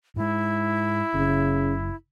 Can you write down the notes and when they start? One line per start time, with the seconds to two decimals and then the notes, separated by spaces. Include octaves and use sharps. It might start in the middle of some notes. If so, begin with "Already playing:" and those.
0.16 G#2 G#3 E4
1.14 F#1 C#3